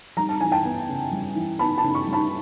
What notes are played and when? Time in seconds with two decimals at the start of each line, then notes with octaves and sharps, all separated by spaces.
0.17 G3 A#5
0.29 A5
0.41 E3 G#5
0.52 G5 A5
0.65 B3
0.89 C#3
1.12 G3
1.35 E3
1.59 B3 A5 B5
1.78 A5 B5
1.84 C#3
1.95 B5 C#6
2.07 G3
2.13 A5 B5